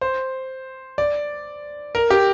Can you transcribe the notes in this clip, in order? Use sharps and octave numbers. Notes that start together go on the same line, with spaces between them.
C5
D5
A#4
G4